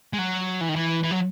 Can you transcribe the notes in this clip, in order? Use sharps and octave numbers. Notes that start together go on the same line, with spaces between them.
G#3
F#3
E3
D#3
E3
E3
F#3